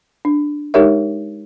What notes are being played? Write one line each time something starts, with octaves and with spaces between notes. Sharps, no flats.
D4
G#3 D#4 G4 A#4 C#5 E5